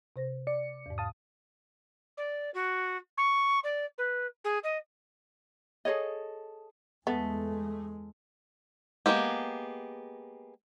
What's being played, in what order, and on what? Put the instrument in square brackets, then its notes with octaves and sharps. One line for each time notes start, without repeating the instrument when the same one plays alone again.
[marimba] C3 C5 A#6
[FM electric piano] D5 C#7
[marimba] E2 G#2
[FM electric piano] F5 A5 D#6
[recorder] D5
F#4
C#6
D5
B4
G#4
D#5
[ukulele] G#4 A4 C#5 D#5
[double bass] E2 G#3 [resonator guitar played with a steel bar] A3 [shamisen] B3
[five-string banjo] G#3 A#3 B3 G4